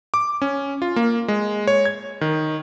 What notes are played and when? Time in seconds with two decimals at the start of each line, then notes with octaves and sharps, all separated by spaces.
0.14 D6
0.42 C#4
0.82 F4
0.96 A#3
1.28 G#3
1.67 C#5
1.85 G#6
2.21 D#3